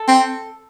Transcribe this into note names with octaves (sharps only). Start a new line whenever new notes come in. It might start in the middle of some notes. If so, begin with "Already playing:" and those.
Already playing: A4
C4